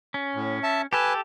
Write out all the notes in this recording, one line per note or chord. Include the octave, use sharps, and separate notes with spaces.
C#4
A2
E5 A5
G4 A4 B4 G#5 A5